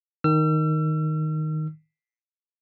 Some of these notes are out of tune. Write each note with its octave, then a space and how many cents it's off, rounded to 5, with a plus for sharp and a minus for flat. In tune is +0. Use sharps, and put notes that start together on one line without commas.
D#3 +0 E6 +40